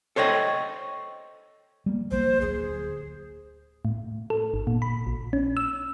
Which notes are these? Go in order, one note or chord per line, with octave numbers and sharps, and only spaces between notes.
A4 C5 C#5 D#5 G5
G3 A#3
A#1 A#3 C5
D1 G#4
A2
A4
G1
A#2
B5
A#1
C#4
E6